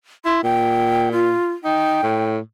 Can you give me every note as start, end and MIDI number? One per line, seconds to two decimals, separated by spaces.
0.25 0.41 64
0.25 0.43 84
0.43 1.34 46
0.43 1.09 79
1.12 1.53 65
1.64 2.00 63
1.64 2.29 79
2.03 2.39 45